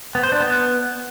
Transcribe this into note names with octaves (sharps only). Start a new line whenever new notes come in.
B3
C5
D4
B3